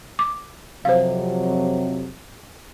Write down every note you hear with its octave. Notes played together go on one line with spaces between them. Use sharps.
D6
F2 C3 F#3 C5 F5